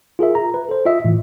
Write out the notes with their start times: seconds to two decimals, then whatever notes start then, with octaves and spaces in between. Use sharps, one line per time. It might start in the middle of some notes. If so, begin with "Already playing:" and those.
0.19 F4 G#4 A#4 E5
0.35 A#5
0.54 B4
0.69 A4 C5
0.86 F4 D#5 E5
1.05 A2 E3